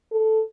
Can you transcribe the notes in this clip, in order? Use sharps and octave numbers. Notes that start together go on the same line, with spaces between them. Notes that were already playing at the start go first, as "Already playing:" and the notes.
A4